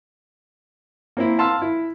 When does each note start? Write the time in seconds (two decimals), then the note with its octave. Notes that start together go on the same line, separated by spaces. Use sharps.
1.17 A#3 C4 E4
1.39 F5 A5 C6 E6 F6
1.62 E4